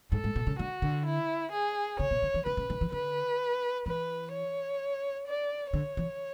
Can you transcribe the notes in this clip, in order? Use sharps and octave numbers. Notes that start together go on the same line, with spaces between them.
G#2 A4
G#2
B2
C#3
D3 F#4
D3
E4
G#4
C#3 C#5
B2
D3
E3
D3 B4
C#3
D3
E3
D3 B4
E3 B4
C#5
D5
D3 C#5
E3